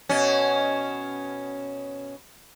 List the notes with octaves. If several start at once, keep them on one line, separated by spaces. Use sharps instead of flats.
B2 C#4